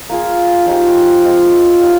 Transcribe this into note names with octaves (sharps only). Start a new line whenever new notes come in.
A#3 F4 G#4
F3 G#3 D#4 G4
G#3 C4 F4
D#4 G4 C#5 F5